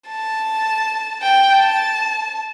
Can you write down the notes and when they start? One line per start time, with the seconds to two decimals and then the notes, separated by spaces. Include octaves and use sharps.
0.09 A5
1.22 G5
1.51 A5